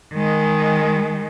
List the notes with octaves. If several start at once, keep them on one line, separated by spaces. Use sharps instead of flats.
D#3 G#3